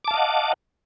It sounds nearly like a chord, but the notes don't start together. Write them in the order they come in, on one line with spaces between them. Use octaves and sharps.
D6 A5 F5 D#5 F#5